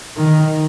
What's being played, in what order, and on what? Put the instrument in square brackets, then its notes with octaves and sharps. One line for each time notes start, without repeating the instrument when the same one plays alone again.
[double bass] D#3